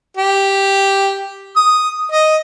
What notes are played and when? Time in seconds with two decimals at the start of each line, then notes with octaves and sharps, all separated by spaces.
0.17 G4
1.56 D#6
2.12 D#5